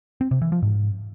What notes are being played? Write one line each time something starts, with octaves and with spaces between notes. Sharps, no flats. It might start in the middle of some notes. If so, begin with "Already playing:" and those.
C4
C3
E3
F3
G#2